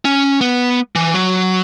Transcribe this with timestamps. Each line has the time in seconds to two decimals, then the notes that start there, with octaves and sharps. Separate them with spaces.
0.05 C#4
0.41 B3
0.95 E3
1.14 F#3